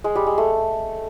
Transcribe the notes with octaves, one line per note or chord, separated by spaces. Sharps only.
G#3
G3
G#3
A3